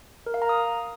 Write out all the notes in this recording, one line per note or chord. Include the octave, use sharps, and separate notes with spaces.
A#4
F5
A#5
D#6